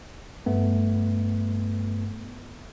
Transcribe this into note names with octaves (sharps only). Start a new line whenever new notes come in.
G2 A3 B3